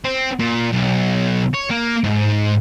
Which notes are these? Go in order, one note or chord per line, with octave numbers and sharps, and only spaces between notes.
C4
A#2
B1
C#5
A#3
G#2